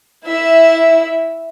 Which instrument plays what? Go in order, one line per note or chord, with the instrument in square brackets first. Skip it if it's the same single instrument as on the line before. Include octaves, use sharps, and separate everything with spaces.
[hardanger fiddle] E4 E5